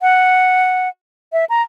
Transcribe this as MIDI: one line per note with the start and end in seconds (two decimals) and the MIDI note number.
0.01 0.89 78
1.33 1.45 76
1.49 1.62 82